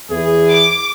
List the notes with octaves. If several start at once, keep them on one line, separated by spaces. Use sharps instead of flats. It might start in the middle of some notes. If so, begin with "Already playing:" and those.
E2 E4 G#4
D6